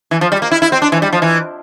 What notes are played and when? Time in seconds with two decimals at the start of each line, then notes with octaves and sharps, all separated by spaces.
0.11 E3
0.21 F3
0.32 G3
0.42 A#3
0.51 E4
0.62 E4
0.72 C4
0.82 D4
0.92 E3
1.02 G3
1.13 F3
1.22 E3